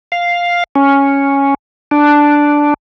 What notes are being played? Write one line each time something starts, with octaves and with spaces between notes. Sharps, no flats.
F5
C#4
D4